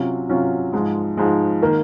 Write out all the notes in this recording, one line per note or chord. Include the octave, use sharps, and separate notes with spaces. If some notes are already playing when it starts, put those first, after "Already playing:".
Already playing: C3 F#3 C#4 F4
C3 F#3 C#4 F4
G#2 F3 G#3
G#2 F3 G#3
D#3 A#3